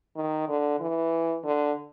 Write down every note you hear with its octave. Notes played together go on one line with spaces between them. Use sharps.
D#3
D3
E3
D3